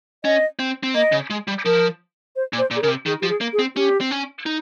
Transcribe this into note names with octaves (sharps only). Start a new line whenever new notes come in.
C#4 D#5
C4
C4
A#3 D#5
C#3
G#3
G3
F3 A#4
C5
A#2
C5
A#2
G#4
C#3 A#4
C3
D#3 G#4
F3 G4
G#4
A#3
G#4
C4
C#4 G4
C4
C#4
D#4